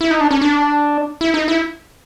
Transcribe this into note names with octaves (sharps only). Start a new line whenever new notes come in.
E4
D#4
D4
C#4
D4
E4
D#4
E4